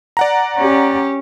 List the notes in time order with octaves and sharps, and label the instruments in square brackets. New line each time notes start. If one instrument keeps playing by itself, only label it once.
[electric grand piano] D5 F#5 A#5
[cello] C#4 G4